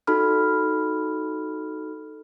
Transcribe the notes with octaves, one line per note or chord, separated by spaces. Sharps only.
D#4 F#4 A4 B5 F6